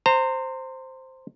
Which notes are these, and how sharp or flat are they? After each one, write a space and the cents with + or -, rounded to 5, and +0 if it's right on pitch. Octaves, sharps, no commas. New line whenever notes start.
C5 +0 A#5 -30